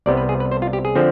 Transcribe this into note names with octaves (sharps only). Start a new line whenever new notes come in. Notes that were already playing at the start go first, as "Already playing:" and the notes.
C2 C3 G3 B3 D5
B4
G#4
B4
C5
F4
G4
G#4
D3 F3 C4